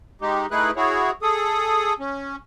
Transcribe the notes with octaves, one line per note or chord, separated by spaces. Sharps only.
G#3 D#4 G4
A3 D#4 E4 G#4 B4 F#6
E4 F#4 G#4 C#5
G#4 A4 D#6
C#4